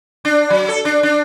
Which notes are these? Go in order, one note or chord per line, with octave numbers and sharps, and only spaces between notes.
D4
F#3
A4
D4
D4